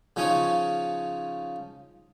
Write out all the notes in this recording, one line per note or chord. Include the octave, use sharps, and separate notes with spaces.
C#3 F3 C#4 D#4 C#5